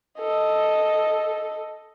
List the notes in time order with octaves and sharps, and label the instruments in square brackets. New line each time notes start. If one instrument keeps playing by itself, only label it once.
[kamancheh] A4 D#5